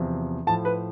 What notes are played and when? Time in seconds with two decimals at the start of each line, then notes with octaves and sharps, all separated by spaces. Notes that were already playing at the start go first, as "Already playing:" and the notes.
Already playing: E2 C3 F3
0.47 A2 F3 A5
0.65 B4